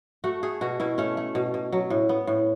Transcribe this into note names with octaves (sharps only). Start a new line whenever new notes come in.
A3 F#4
A3 G#4
B2 F#4
B2 E4
A3 C#4
A3
B2
B2
F#3
A2
B3
A2